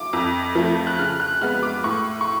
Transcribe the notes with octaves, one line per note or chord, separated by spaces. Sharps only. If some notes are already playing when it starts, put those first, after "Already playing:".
Already playing: D6
F2
F3 A3
F#6
C#3 F6
F#6
G#3 B3 F6
D6
A2 C#6
C#6